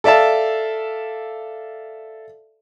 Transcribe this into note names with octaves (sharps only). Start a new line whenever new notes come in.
A4 D5 E5 F5 A5